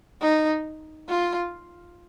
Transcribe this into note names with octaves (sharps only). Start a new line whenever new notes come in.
D#4
F4